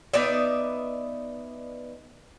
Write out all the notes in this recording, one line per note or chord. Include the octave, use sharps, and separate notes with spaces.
B3 D#4 D5 E5